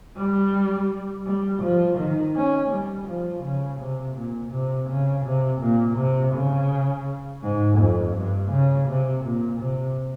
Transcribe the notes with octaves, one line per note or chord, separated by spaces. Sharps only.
G3
G3
F3
D#3
C#4
G3
F3
C#3
C3
A#2
C3
C#3
C3
A#2
C3
C#3
G#2
F2
G2
C#3
C3
A#2
C3